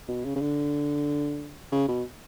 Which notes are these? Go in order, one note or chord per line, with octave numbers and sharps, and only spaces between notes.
B2
C#3
C#3
D3
C#3
B2